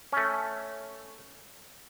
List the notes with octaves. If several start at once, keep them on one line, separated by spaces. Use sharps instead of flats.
A3 C#4